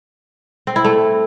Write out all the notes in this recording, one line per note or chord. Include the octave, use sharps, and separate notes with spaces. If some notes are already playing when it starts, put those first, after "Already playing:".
C4
E4
A3